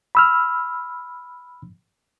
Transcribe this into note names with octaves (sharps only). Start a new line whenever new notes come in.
B5 E6 F6